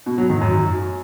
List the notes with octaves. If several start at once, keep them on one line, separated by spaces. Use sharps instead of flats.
B2
F#3
D#3
F#2